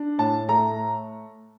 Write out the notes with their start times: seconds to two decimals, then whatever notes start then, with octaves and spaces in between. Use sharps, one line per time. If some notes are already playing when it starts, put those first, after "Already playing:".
Already playing: D4
0.18 A2 A5
0.49 A3 A#5